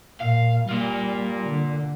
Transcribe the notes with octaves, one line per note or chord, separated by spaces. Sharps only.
A#2 F5
G3 A#3 F4
D3